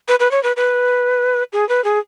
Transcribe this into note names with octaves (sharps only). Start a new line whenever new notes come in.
B4
B4
C#5
B4
B4
G#4
B4
G#4